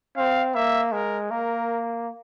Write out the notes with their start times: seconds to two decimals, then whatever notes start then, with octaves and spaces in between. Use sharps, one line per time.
0.17 C4 F5
0.55 A#3 E5
0.92 G#3 A#4
1.31 A#3 A#4